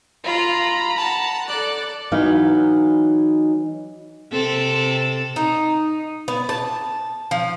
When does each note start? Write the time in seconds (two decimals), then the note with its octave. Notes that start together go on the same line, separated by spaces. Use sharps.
0.24 F4 A#5 B5
0.98 F#5 A5
1.48 A4 D5 F#6
2.12 E3 F#3 B3 D#4 F5
4.32 C3 C4 A4
5.36 D#4
6.28 B3
6.49 A5
7.31 F3